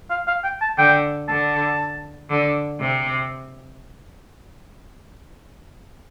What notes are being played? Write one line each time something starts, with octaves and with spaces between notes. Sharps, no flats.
F5
F5
G5
A5
D3 G5
D3 A5
D3
C3